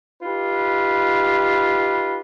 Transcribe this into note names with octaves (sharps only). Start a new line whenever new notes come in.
D#4 F4 G4 B4